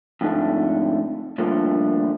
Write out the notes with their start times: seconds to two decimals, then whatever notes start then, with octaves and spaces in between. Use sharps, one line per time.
0.21 F2 G#2 D3 A3
1.38 G2 A#2 D3 F3 A3